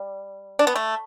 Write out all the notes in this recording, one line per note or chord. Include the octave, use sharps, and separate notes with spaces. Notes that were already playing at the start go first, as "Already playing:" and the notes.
Already playing: G3
D4
B3
A3